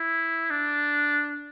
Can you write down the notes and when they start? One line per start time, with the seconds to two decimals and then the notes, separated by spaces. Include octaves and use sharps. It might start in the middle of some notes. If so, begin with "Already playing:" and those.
Already playing: E4
0.51 D4